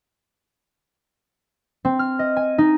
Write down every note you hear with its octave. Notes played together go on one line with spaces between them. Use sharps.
C4
F6
D#5
G#5
D#4